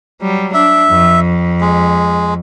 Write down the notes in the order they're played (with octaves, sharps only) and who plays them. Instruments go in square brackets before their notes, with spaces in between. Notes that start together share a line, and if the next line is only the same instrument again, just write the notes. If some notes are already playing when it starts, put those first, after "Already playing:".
[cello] F#3 G3
[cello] D4 [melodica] E5
[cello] F2
[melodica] G#3